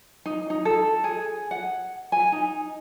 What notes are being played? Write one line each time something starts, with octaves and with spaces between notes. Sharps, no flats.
D#4
D#4
A4
G#4
F#5
G#5
D#4